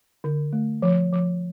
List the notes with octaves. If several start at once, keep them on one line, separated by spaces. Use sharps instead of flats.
D3
A3
F3
F3